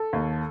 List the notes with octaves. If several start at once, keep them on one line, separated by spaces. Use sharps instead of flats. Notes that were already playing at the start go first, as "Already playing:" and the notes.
Already playing: A4
D#2